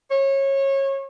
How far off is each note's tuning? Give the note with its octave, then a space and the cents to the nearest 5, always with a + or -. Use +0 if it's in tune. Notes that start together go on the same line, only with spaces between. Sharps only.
C#5 -25